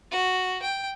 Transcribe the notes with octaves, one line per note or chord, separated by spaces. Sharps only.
F#4
G5